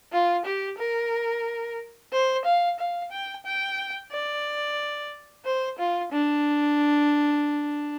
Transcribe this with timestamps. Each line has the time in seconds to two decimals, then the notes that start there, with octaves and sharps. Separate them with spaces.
0.13 F4
0.45 G4
0.79 A#4
2.13 C5
2.45 F5
2.79 F5
3.12 G5
3.46 G5
4.12 D5
5.45 C5
5.78 F4
6.12 D4